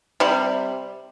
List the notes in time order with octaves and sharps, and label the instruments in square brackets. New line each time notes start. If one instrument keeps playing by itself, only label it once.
[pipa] C3 G3